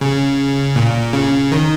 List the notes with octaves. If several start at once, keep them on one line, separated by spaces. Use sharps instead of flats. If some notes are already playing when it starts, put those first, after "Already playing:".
C#3
A#2
C#3
D#3